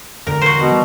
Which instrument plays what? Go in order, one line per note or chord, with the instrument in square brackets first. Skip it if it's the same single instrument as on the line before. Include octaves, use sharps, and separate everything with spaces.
[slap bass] E1 D3 [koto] A#4
[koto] F#4 C5
[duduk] B2
[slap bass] D3 E3 G3